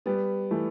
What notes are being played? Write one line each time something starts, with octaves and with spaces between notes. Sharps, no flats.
G3 B3
E3 A3